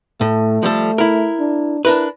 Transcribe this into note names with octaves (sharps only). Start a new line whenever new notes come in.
A2 A3
F3 G3 A4
E4 A#4
D4
D4 E4 A#4 B4